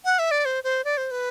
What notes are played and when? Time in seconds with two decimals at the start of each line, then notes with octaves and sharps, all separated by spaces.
0.05 F#5
0.19 E5
0.31 D5
0.45 C5
0.64 C5
0.85 D5
0.97 C5
1.11 B4